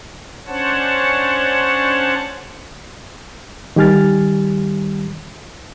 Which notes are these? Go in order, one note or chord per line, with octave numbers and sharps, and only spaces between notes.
C#4 D4 C5 C#5 F#5 A5
D#3 G3 G4 G#5 F6 A6